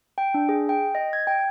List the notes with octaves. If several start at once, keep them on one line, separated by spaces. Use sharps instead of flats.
G5
D4
G#4
G5
D#5
G#6
G5